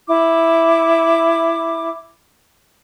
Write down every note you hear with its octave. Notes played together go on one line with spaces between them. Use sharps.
E4 D6